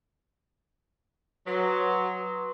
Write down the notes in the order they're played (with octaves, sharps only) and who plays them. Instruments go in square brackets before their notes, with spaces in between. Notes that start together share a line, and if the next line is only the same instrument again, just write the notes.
[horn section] F#3 [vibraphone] B4 C6 D#6